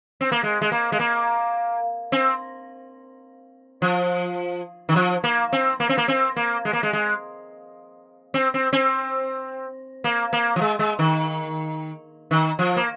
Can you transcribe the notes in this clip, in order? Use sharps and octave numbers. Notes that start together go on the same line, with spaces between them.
C4
A#3
G#3
G#3
A#3
G#3
A#3
C4
F3
D#3
F3
A#3
C4
A#3
C4
A#3
C4
A#3
G#3
A#3
G#3
G#3
C4
C4
C4
A#3
A#3
F3
G#3
G#3
D#3
D#3
F3
A#3